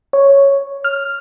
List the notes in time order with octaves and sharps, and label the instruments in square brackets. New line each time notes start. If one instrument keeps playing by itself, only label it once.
[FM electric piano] C#5
F6